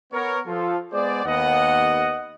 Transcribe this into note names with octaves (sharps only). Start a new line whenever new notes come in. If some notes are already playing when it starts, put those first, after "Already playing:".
B3 A#4 C#5
F3 F4 A4
G#3 B3 G#4 C5 D5
D#2 B3 D#5 F#5